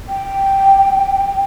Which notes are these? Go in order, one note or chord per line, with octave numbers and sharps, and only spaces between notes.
G5